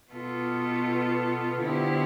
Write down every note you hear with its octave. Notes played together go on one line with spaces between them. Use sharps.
B2 B3 F4 A4
D3 F3 B3 E4 G4